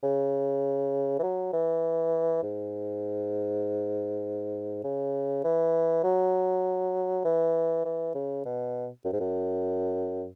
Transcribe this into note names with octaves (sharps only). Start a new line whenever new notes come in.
C#3
E3
F#3
E3
G#2
C#3
E3
F#3
E3
E3
C#3
B2
F#2
G#2
F#2